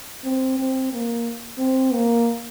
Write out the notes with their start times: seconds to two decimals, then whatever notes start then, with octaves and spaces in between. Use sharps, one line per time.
0.24 C4
0.58 C4
0.92 A#3
1.58 C4
1.92 A#3